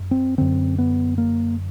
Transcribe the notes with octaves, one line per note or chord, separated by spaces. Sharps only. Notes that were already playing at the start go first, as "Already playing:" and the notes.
Already playing: F#2
C4
F#2 D3 C4
B3
A#3